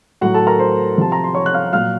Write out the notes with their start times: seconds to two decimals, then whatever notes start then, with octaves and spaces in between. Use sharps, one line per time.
0.21 A2 F#3 F#4 F#5
0.34 A4 A5
0.47 A#4 A#5
0.59 C5 C6
0.97 C3 F3 A5
1.12 A#5
1.24 C6
1.34 C#5 C#6
1.46 F#6
1.54 F5 F6
1.73 A#2 F#3 F5 F6